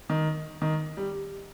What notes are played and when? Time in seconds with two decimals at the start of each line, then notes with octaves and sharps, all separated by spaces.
0.10 D#3
0.62 D#3
0.97 G3